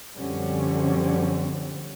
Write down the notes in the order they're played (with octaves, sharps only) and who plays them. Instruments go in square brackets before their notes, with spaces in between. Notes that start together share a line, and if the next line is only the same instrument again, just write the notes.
[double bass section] F#2 D3 F3 G3 C4 C#4